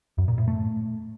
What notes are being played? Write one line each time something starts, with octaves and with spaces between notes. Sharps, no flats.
F#2
A#2
A2
A3